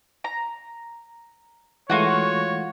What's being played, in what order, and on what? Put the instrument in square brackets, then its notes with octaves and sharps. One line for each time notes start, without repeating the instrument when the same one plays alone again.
[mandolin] A#5
[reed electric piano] E3 G#3 A3 [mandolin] F4 F#4 F#5 [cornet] C#5